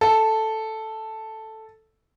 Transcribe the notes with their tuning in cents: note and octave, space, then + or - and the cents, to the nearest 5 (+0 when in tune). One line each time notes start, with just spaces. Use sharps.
A4 +0